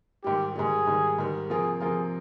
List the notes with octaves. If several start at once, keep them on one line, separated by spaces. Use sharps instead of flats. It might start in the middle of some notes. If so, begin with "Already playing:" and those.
G#2 D#3 G3 G4
G#2 D#3 G3 G#4
G#2 D#3 G3
G#2 D#3 G3
C3 F3 A#3 F4 G#4 A#4
C3 F3 A#3 F4 G#4 A#4